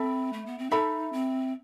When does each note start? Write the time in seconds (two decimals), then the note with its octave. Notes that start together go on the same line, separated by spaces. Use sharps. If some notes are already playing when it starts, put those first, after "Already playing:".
Already playing: C4 A4 E5 B5
0.33 A3
0.46 B3
0.59 C4
0.70 D#4 A4 E5 B5
1.13 C4